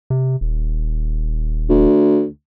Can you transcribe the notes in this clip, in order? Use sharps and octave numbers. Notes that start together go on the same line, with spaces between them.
C3
D#1
D2